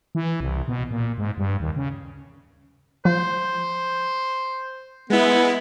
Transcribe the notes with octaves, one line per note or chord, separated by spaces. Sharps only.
E3
C2
B2
A#2
G#2
G2
D#2
C#3
F3 C5
G#3 B3 E4